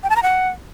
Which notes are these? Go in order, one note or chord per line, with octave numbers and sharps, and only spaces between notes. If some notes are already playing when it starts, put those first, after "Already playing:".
G5
A5
A#5
F#5